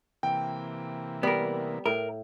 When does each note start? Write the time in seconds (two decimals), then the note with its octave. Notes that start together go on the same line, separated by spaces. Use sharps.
0.23 C3 E3 A#3 G5
1.23 G3 B3 A#4
1.86 A2 A#4